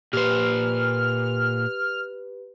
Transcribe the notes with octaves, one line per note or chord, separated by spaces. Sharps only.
A#2 G4 B4 C5 F6